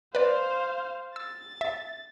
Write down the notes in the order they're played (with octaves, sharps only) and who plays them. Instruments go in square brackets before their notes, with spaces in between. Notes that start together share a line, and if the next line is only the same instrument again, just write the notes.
[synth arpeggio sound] B4 D5 [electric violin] C5 F5
[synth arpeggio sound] E6 [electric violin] A6
[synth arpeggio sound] E5